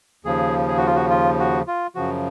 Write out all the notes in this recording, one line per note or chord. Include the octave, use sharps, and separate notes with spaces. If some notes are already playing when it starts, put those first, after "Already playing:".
D#2 C#3 F3 G#4
G#4
F#4
F4
F#4
F4
F#4
F4
F#2 C#3 F3 F#4